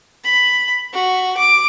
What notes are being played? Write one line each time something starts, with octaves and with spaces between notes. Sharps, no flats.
B5
F#4
D6